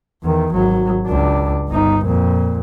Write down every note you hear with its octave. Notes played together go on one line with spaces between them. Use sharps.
E2 D#3
G#1 F#3
C#2 D4
G1 D#4
F2 A#2